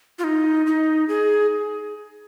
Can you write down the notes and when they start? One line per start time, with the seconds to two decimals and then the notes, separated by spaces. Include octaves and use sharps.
0.19 F4
0.24 D#4
0.67 D#4
1.08 G#4